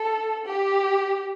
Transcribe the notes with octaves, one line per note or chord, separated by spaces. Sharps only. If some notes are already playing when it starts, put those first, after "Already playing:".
Already playing: A4
G4